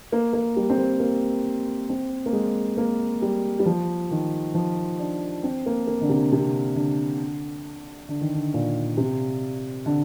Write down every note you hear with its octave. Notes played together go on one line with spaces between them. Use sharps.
A#3
A#3
G3
C4
A#3
A#3
C4
A#3
G#3
A#3
G3
G3
F3
D#3
F3
D4
C4
A#3
A#3
D3
C3
C3
D3
D3
D#3
D3
A#2
C3
D3